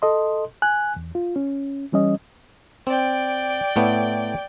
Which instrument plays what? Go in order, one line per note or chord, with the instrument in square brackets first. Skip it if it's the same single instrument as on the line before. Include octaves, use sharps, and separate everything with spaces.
[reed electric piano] A4 D#5 C6
G#5 F#6
E2
F4
C#4
E3 G3 C#4 D#5
[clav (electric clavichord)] C4 [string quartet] D5 G5
[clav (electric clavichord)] A2 A3 B3